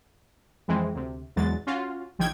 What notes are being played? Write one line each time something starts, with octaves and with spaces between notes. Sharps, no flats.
F2 E3 G#3 C4
D2 C3
A#1 E2 F#3 G#3 A6
C#4 F4 F#4
A#1 D#3 E3 G5 G#6